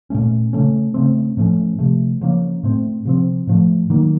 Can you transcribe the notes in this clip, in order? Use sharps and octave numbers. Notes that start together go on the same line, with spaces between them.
A#2 A3 C#4
C#3 A3 C#4
C#3 A3 C4
A2 F3 A3 C#4
C3 F3 A3
C#3 F3 A#3 C#4
A2 A3 C4
C3 F3 C4
A2 F3 A3
D#3 F#3 A#3